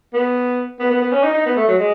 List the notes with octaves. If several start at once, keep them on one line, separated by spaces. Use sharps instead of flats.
B3
B3
B3
B3
C#4
D#4
D#4
B3
A3
F#3
G#3